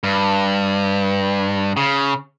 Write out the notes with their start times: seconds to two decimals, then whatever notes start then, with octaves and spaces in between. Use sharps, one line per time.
0.03 G2
1.77 C#3